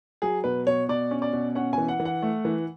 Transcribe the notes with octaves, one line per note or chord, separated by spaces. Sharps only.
F#3 G#4
B2 B4
B2 C#5
B2 D5
C#4
D5
B2
C#4 F#5
E3 G#5
F#5
E3
F#5
A3
E3